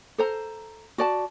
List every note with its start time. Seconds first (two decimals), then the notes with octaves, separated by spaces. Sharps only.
0.18 A4 C5 A#5
0.98 F#4 D5 A5